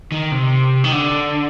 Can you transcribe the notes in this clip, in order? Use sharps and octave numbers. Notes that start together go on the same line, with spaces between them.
D#3
C3
D#3
D3